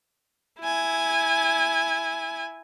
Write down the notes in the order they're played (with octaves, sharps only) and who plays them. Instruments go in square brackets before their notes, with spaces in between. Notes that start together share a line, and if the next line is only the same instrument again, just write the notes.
[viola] E4 G#5